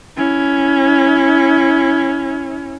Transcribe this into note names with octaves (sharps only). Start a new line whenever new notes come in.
C#4 E4